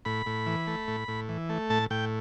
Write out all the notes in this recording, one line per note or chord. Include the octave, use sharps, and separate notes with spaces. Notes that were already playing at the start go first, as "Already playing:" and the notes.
A2 B5
A2
E3
A3
A2
A2
E3
A3
A2 A5
A2 G5